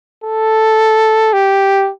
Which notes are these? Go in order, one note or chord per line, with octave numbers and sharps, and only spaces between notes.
A4
G4